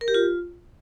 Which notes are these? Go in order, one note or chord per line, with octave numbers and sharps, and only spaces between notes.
A#4
G4
F4